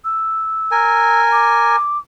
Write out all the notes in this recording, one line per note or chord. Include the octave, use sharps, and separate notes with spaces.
E6
A#4 G#5
D6